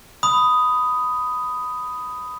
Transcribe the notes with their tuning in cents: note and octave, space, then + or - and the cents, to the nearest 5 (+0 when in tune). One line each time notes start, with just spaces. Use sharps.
B5 +15 D#6 +0